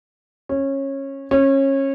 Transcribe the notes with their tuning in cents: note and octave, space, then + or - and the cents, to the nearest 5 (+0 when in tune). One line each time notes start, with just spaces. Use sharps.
C#4 -20
C#4 -25